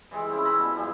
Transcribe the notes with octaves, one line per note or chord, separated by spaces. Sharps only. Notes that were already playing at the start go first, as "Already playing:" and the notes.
E3 G3 G#3
G#3 C4 C#4 E4
C5 D5 A#5 B5
B2 E3 G3
G2 F3 G3